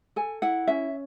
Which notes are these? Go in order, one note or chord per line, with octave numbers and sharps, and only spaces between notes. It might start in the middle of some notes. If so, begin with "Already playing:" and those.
A4 G#5
E4 F#5
C#4 E5